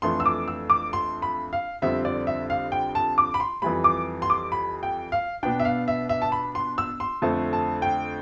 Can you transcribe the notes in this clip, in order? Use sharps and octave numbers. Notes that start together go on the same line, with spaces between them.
F2 E3 A3 D4 C6
E6
D6
E6
D6
C6
B5
F5
F2 D3 G3 C4 E5
D5
E5
F5
G5
A5
D6
B5
C6
F2 E3 G3 B5
D6
C6
D6
B5
G5
F5
B2 B3 D4 G5
E5
F5
E5
E5
A5
B5
C6
E6
C6
F2 D3 A3 C4 A5
A5
G5